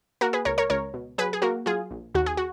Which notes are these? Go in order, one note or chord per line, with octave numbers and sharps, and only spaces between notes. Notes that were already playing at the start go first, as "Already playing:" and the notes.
A#3 F#4 A#4
G#4 B4
C#2 A#4 C#5
A#4 C#5
C#2 A#4 C#5
B2
F#3 G#4 B4
G#4
A#3 F#4 A#4
F#3 F4 G#4
A#1
D#2 F#4
G#4
F#4